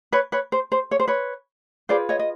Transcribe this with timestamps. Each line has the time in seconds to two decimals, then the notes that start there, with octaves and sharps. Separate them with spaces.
0.13 B4 C#5
0.32 B4 C#5
0.52 C5
0.72 C5
0.91 C#5
1.00 C5
1.08 B4 C#5
1.89 F4 G#4 B4 C5 D5
2.09 C#5 D#5
2.19 D#5